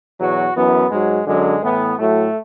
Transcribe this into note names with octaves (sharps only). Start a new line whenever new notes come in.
E2 B2 F#3 F#4
F#2 E3 B3
G#2 F#3 G#3
F#2 D3 F#3 G#3
A2 E3 B3
A2 F#3 A3